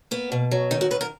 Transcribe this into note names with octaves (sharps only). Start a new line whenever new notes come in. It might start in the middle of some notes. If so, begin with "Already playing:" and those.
A#3 B3
B2
F#3
D#3 D#4
F#4
D#3 B4
A#4